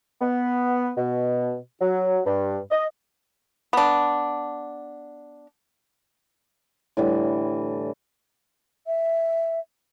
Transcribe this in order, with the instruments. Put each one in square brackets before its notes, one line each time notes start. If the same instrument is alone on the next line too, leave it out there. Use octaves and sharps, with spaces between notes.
[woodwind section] B3
B2
F#3
G2
D#5
[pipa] B3 D4
[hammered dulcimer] A2 D3 E3 G3
[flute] E5